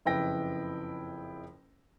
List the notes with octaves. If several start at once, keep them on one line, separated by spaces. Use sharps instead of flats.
F#1 F2 E4 B4 G5 A#6